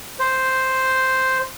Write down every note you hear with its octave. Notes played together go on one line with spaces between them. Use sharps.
C5